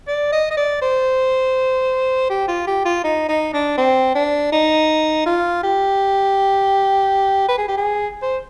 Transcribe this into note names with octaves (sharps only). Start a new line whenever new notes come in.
D5
D#5
D#5
D5
C5
G4
F4
G4
F4
D#4
D#4
D4
C4
D4
D#4
F4
G4
B4
G#4
G4
G#4
C5